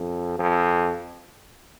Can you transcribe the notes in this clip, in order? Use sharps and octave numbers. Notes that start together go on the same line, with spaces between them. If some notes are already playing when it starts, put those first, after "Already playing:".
Already playing: F2
F2